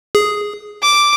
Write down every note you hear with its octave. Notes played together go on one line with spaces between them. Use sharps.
G#4
D6